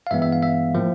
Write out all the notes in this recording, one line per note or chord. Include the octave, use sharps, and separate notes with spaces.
F5
G2 E3 G#3 B3 E5
E5
F5
E5
A2 F3 A#3